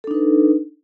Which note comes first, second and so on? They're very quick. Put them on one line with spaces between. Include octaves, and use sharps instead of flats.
A4 D4 D#4 B4